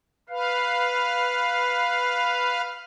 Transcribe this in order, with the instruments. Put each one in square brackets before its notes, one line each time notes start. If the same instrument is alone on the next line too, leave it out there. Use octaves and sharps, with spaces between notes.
[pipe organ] B4 F5